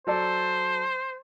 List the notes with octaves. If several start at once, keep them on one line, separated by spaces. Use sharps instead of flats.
F#3 A4 C5 D5